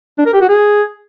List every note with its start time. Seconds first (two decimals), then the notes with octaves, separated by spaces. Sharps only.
0.18 D4
0.26 A#4
0.34 G4
0.41 F#4
0.49 G#4